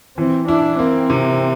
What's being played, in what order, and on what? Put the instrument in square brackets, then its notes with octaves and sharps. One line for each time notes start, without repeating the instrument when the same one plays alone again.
[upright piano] E3 [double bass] C4
[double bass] D4 [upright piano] E4
[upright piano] A#3 [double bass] C4
[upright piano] C3